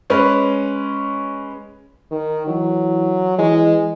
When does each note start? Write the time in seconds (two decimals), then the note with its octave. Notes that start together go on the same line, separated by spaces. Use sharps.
0.10 G#3 C#4 B4
2.11 D#3
2.48 E3 F#3
3.38 E3 G#3